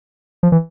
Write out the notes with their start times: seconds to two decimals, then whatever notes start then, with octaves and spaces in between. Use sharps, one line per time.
0.43 F3
0.52 E3